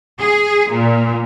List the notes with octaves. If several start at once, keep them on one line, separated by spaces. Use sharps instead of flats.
G#4
A#2